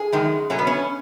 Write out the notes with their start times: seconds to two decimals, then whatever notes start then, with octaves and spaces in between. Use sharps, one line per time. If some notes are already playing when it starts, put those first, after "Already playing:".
Already playing: G#4
0.12 F#2 D#3 G#3
0.50 B2 F#3 A3 C#4
0.59 B3
0.67 C#4